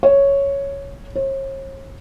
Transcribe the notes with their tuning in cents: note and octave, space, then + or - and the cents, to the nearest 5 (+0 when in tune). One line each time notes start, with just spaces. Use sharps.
C#5 +0
C#5 -45